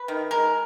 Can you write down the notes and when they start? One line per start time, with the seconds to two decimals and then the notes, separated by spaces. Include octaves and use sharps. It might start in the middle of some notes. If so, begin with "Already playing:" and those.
Already playing: B4
0.08 D#3
0.31 G#3 A#4